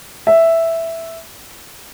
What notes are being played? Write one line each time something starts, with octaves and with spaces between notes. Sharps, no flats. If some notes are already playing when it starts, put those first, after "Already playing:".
E5